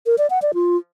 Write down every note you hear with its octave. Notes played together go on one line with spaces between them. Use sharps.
A#4
D5
F#5
D5
F4